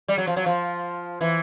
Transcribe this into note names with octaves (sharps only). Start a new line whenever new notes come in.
G3
F#3
F3
F#3
F3
E3